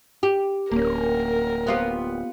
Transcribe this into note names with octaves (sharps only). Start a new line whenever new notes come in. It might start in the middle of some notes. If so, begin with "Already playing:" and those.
G4
D1 A#3 C#4 A#4
B3 F4 G4